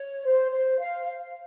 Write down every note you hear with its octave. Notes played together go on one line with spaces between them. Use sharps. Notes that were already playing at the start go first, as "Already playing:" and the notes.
Already playing: C#5
C5
C5
F5